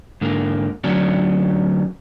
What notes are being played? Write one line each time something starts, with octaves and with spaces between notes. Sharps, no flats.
G#2 D3 A#3
D2 F#3 C#4 D4